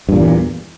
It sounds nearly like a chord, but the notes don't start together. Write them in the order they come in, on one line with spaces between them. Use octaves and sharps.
G2 A#2 E2